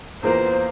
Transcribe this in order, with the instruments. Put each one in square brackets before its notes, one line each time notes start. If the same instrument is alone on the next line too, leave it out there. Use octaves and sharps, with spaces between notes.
[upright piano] E2 E3 A#3 F4 A#4 [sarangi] C5